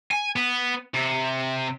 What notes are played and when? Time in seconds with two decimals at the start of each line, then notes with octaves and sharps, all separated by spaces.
0.11 G#5
0.36 B3
0.94 C3